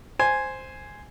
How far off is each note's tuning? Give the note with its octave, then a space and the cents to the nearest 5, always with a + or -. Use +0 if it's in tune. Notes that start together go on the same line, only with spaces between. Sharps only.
C5 +0 G#5 +0